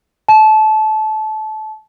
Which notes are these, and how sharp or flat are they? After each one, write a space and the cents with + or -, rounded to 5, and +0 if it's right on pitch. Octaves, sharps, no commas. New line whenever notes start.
A5 -25